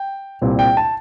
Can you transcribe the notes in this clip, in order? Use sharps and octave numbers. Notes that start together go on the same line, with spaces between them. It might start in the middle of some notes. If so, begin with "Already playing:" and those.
Already playing: G5
C2 A#2 G3 C4
G5
A5